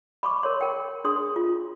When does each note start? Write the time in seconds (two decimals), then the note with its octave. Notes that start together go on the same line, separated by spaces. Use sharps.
0.23 B5 C#6 D6
0.43 A#4 C#5 C6
0.61 A#4 G5
1.04 D4 G#4 C6 D#6
1.36 F4